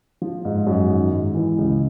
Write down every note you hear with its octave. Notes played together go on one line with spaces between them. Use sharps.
F3
G#2
F#2
D#3
G#2
E3
C#2